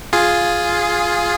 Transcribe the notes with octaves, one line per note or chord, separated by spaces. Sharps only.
F4 G#4